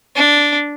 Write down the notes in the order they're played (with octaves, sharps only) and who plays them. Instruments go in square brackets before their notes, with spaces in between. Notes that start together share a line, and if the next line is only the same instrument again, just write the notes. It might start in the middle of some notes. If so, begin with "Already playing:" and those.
[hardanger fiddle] D4